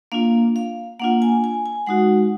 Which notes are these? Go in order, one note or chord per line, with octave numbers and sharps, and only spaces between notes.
A#3 D4 F4 F5
F5
A#3 D4 F4 F#5
G#5
G#5
G#5
G#3 D#4 F#4 F#5